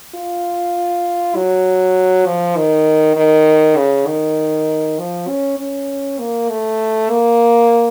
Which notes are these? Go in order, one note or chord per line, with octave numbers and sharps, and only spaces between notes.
F4
F#3
F3
D#3
D#3
C#3
D#3
F3
C#4
C#4
A#3
A3
A#3